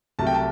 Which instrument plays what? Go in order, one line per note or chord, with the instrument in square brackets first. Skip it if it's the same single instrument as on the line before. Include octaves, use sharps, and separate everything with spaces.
[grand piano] C2 C3 F#3 A3 A5
G5
A5